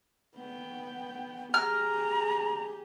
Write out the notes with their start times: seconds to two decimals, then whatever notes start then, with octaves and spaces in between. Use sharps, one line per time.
0.36 B3 G5
1.54 G4 G#4 A#5 F6